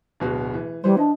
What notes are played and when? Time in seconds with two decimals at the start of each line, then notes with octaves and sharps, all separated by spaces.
0.20 D1 B2 F#4
0.54 E3
0.84 E3 G3 C5
0.98 D4 D#5